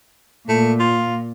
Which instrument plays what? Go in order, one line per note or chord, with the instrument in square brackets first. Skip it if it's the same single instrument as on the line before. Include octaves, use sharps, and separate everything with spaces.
[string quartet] A#2 [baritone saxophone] A3
[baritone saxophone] F4